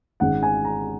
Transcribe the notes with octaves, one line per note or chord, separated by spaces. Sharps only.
G#1 G#2 G#3 C#4 F#5
G#5
A#5